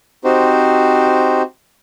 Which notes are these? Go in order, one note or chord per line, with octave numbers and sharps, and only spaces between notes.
C4 D#4 F#4 G4 C5